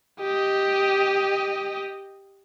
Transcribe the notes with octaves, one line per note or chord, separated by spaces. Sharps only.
G4 D#5